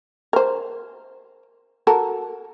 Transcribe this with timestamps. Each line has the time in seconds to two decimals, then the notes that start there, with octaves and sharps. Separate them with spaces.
0.33 A#4 C5
1.87 F#4 A4 A#4